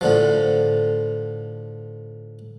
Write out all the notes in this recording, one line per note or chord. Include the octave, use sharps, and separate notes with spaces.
A2 D3 F3